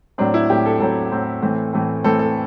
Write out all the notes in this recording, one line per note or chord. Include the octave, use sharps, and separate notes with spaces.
A2 F#3 C4 D4
E4
A2 F#3 C4 G4
A4
A2 F#3 C4 A4
A2 F#3 C4
A2 E3 A3 C4
A2 E3 A3 C4
A2 E3 A3 C4 A4
A4